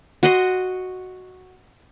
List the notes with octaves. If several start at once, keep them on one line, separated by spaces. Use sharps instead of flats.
F#4 D#5 C6